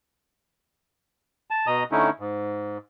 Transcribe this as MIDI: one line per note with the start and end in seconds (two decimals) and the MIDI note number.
1.51 1.67 81
1.67 1.83 47
1.67 1.83 75
1.67 1.83 82
1.67 1.83 87
1.92 2.10 50
1.92 2.10 57
1.92 2.10 61
1.92 2.10 63
1.92 2.10 64
2.19 2.78 44